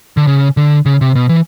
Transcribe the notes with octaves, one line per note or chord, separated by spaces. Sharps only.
D3
C#3
D3
C#3
C3
B2
E3